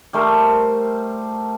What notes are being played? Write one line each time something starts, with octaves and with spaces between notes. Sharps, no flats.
G3 A3 A#4 C5